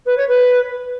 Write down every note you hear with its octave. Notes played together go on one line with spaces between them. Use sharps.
B4
C#5
B4